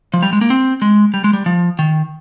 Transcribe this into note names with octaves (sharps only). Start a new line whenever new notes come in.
F3
G3
G#3
A#3
C4
G#3
G3
G#3
G3
F3
D#3